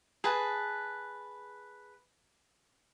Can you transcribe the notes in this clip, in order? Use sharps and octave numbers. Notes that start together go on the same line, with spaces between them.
G#4 B4 A5